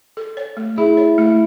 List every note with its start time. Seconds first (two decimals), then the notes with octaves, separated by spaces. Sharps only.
0.17 A4
0.37 C#5
0.57 A3
0.78 E4 G#4
0.97 C#5
1.18 A3